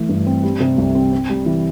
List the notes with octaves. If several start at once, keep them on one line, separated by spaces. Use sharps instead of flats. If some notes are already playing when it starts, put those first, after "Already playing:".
Already playing: E3 A3
G2
C4
G3
C3
C2
C4
C4
G3
E3